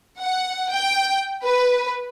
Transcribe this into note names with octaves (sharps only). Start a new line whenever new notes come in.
F#5
G5
B4